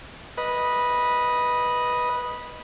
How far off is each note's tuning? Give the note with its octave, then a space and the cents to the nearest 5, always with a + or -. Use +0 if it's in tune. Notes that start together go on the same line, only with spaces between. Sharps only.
B4 -10 D#5 +0